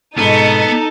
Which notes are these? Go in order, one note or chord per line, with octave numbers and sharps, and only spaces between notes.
F2 G#2 B2 B3 D#4 A4